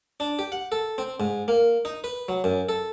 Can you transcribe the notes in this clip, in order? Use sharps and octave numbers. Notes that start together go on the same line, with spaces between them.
D4
G4
F#5
A4
C4
G#2
A#3
D#4
B4
F#3
F#2
A4